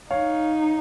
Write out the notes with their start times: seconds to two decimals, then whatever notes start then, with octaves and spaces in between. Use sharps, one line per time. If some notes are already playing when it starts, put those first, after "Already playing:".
0.11 D#4 C#5 F5